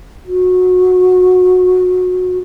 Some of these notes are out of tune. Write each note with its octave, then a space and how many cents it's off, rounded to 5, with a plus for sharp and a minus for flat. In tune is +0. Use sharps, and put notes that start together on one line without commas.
F#4 -20